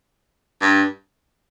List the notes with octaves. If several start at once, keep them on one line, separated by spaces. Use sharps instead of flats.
G2